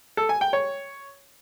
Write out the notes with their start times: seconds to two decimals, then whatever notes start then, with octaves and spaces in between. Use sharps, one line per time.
0.17 A4
0.29 G#5
0.41 G5
0.53 C#5